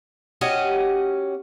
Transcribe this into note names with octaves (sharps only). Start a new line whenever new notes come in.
C#4 F#4 G4 D#5